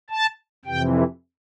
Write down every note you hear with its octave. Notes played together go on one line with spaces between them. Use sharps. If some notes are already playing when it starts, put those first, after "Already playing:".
A5
F2 C3 E3 G5